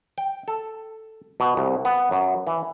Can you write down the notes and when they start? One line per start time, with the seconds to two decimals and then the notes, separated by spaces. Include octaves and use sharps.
0.18 G5
0.48 A4
1.40 B2
1.57 C2
1.85 B3
2.11 F#2
2.47 E3